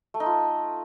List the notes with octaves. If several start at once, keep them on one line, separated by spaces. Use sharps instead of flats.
A3
D#4
F4